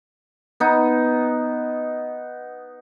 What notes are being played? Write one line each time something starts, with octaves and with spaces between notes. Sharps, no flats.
B3 D#4